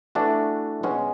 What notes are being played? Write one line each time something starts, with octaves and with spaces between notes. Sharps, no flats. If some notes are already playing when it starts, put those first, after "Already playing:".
E3 A3 D4 F#4
B2 G#3 C#4 F#4